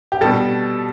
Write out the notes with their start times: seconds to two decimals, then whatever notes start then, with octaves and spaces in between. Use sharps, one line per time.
0.12 G4
0.21 B2 G3 A4